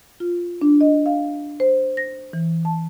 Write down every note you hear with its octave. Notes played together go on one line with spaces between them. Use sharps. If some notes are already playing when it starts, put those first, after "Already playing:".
F4
D4
D#5
F5
C5
A#6
E3
A5